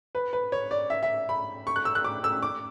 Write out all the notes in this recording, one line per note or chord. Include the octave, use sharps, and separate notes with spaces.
B4
B4
C#5
D5
E5
E5
B5
C#6
F#6
E6
F#6
D6
E6
D6